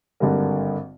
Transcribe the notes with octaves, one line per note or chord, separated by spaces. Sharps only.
G#1 G2 D3 G3 A#3